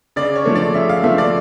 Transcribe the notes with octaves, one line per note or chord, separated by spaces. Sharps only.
C#3 D5
C#5
F3 A3
D5
C#3 E5
F5
F3 A3 E5
D5